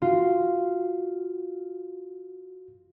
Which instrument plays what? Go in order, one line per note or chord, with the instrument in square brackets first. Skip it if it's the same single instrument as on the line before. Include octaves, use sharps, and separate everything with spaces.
[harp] F4 [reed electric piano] F#4